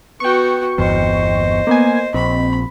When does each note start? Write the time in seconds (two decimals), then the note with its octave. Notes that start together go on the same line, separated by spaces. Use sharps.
0.20 B3 F#4 G5 C#6
0.78 G1 E2 C5 D#5
1.67 A#3 B3 G#5
2.14 A#1 C4 B5